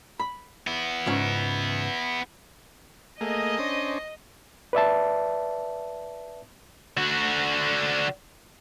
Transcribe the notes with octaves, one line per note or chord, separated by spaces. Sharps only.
B5
B3 E4
C#2 G#2 C#4
A3 A#3 G#4 D#5
C#4 D4 C5
B4 D5 E5 A5
D3 F#4